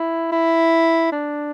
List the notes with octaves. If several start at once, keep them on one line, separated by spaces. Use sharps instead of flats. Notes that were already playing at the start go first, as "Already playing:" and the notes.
Already playing: E4
E4
D4